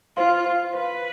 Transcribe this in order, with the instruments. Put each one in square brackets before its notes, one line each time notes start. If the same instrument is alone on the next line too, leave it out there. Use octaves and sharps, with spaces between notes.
[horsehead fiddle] F4 [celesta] C5 F5 C6
[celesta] C5 F5 C6
[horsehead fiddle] B4 [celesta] C5 F5 C6